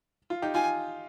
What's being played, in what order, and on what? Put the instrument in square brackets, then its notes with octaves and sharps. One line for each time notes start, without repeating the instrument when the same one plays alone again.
[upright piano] F4
D#4 G4
[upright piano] F4 [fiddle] G#5